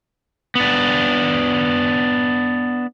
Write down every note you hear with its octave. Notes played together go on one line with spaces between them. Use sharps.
B3 D4